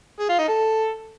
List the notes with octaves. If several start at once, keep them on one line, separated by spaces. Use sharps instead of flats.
G#4
F4
D#4
A4